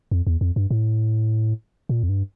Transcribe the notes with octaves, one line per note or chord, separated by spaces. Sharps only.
F2
E2
F2
G2
A2
A#2
F2
G2